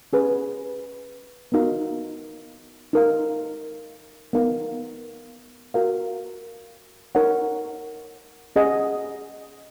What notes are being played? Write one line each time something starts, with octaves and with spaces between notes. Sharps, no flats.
C#4 G#4 B4
B3 D#4 F#4 A#4 F5
D#4 A#4 F5
B3 D#4 A#4 F5
F#4 A#4 F5
D#4 A#4 C#5 F#5
C#4 G#4 D#5 F#5